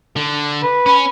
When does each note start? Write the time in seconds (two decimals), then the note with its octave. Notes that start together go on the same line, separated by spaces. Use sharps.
0.16 D3
0.62 B4
0.86 C#4 B5